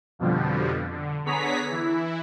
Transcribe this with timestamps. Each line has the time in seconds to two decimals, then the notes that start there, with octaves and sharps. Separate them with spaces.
0.19 F2 B2 D3 F3 G3
0.91 D3
1.25 D3 B3 G#4 C#5 A#5 B6
1.71 E3 E4